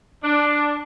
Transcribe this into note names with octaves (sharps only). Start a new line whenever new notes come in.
D4